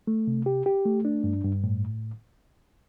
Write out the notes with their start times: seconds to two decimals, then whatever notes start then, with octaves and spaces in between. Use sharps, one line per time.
0.07 A3
0.27 C3
0.46 G4
0.66 G4
0.86 A3
1.05 D4
1.24 G2
1.44 G2
1.64 A2